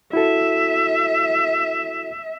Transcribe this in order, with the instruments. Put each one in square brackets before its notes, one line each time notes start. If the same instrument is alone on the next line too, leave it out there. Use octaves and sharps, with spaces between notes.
[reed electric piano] E4 F#4 A4 [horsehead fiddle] E5